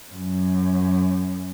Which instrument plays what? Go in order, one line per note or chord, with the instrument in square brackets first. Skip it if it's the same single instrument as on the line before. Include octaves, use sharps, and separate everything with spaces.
[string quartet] F#2